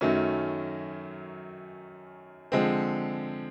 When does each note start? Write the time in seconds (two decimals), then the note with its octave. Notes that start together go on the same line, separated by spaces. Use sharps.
0.01 F#2 D#3 F#3 A3 C#4
2.52 D3 F3 G#3 C4